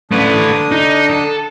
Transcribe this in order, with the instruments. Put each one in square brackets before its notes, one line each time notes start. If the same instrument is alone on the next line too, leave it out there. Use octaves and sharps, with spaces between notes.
[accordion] D3 D4 D#6 [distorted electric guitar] A3 B4
[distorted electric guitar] D#4
A4